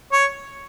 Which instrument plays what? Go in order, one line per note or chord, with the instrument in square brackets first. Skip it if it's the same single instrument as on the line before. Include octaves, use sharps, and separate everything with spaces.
[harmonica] C#5